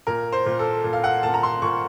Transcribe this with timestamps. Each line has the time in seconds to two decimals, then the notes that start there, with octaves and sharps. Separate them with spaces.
0.07 A#2 A#4
0.32 C5
0.46 A#2
0.59 A4
0.84 A#2
0.93 F5
1.04 F#5
1.23 A#2 A5
1.34 A#5
1.43 C6
1.62 A#2 C#6